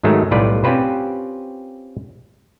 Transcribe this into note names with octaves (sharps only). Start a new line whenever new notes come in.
G#2 D#3 F#3 G#3 A3 D#4
B1 A2 G3 F4 B4 D5
C4 C#4 F4 G4 B4 C5